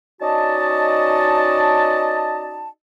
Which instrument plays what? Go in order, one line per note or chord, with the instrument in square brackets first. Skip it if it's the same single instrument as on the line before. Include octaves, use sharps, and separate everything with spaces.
[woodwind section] C#4 D#4 F#4 D5 D#5 A5